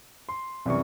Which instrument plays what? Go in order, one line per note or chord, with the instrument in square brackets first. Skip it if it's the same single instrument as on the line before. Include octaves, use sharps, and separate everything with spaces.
[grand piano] C6
[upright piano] C2 D5 [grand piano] F#2 E3 C#6